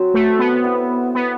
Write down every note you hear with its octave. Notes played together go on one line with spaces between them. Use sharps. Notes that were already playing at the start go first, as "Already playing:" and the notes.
Already playing: F#3 C4 F#4 C5
A3
B3
C4 E4 A4 E5
B3